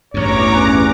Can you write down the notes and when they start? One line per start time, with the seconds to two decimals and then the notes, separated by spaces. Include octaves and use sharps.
0.14 A1 E2 G2 C#5 A#5 D6
0.55 C#4 B4